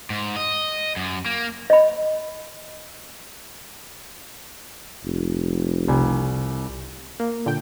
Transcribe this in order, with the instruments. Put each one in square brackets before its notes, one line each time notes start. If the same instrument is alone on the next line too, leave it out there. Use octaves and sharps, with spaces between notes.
[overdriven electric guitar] G#2
D#5
F#2
A#3
[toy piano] D#5 B5
[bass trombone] F1
[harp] C2 G#5
[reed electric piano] A#3
[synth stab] A#2 D3 G5